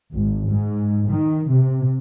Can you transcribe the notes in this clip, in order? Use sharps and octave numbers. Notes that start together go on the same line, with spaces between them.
G#1
G#2
D#3
C3